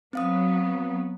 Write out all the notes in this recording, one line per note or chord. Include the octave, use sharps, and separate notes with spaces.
F#3 B3 C4 F5 D#6